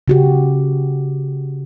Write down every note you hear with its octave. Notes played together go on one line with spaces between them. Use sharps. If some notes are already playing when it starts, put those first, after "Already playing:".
C#3 F#4 G4